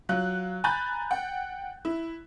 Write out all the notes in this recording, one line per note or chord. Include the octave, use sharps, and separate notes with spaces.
F#3 F4 F#6
G#5 A#5 B5 F#6 G6 A6
F#5 G5
E4